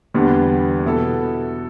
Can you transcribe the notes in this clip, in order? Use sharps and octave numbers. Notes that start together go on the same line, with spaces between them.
E2 D3 G3 B3 D4
B2 B3 E4 A4